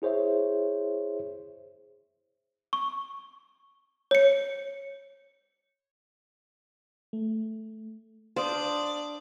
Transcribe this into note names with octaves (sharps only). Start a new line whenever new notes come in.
E4 G#4 C5 C#5 E5
C#6
C#5 C#7
A3
D4 C5 D5 F5 D#6